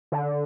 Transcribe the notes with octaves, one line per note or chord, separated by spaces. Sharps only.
D3